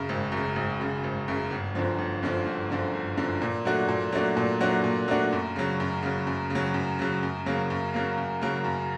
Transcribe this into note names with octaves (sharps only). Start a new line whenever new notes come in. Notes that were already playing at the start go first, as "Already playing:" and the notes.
Already playing: F#2 C#3
G#1
F#2
C#3
G#1
F#2 C#3
G#1
F#2 C#3
G1
F#2 D3 F3
G1
F#2 D3 F3
G1
F#2 D3 F3
G1
F#2 D3 F3
A#2
F#3 A3 D4 F#4
A#2
F#3 A3 D4 F#4
A#2
F#3 A3 D4 F#4
A#2
F#3 A3 D4 F#4
F#2
C#3 F#3
F#2
C#3 F#3
F#2
C#3 F#3
F#2
C#3 F#3
F#2
C#3 F#3 A#3
F#2
C#3 F#3 A#3
F#2
C#3 F#3 A#3
F#2